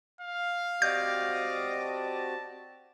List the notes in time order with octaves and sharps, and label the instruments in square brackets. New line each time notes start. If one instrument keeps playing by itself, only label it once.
[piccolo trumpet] F5
[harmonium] C4 F#4 G4 [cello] D5 D#5 [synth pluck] G6
[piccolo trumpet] A5